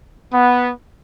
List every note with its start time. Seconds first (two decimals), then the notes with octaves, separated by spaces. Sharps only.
0.32 B3